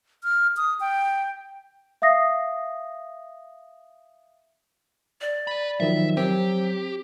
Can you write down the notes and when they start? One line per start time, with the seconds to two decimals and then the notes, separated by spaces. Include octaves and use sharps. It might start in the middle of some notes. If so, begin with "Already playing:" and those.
0.24 F6
0.57 D#6
0.80 G5
2.02 E5 F5 D#6 A#6 C7
5.21 D5
5.47 B4 B5
5.80 D#3 F3 F#3 E5
6.17 F#3 C4 G4